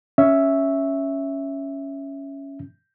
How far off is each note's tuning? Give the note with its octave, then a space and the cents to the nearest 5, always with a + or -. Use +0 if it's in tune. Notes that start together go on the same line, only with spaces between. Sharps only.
C#4 +0 E5 +0